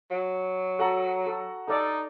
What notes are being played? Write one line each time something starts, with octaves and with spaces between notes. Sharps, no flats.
F#3
F#4 A4 F#5 A#5
A4
D#4 A4 D5